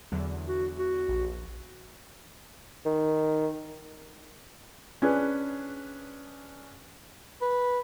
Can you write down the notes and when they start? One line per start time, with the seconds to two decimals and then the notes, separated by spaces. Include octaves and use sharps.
0.12 E2 D3 F#3
0.47 F#4
0.78 F#4
1.09 A#1
2.85 D#3
5.02 C#4 D4 G#4 B4
7.41 B4